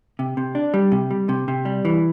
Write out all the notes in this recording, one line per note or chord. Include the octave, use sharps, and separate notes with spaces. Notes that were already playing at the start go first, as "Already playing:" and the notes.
C3
C3
D4
G3
C3
G3
C3
C3
G3
E3